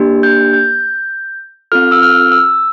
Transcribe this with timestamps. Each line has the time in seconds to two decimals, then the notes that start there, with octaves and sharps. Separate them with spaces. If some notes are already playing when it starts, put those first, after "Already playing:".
Already playing: A#3 D4 G4
0.23 G6
0.53 G6
1.72 C4 F4 A4 F6
1.92 E6
2.02 F6
2.32 E6